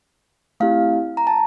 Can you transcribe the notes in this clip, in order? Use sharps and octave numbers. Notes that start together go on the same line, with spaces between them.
A3 C4 E4 G4 F5
A#5
A5